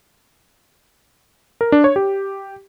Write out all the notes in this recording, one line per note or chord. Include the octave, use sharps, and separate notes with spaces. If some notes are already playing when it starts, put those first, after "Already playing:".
A#4
D4
C#5
G4